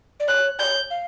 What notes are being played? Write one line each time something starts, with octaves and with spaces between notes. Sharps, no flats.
D5
C#5 F#6
D5 G6
C#5
F5